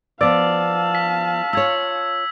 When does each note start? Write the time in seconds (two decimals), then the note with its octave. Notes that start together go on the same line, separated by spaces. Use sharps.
0.21 F3 B3 D5 F5 A5 E6
0.95 B6
1.53 F4 C#5 E6 G#6